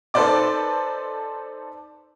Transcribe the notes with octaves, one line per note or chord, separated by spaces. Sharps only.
D#4 A4 B4 C5 D5 D6